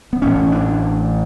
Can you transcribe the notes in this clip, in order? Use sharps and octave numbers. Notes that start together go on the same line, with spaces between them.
B3
A1 A2 C#4
D4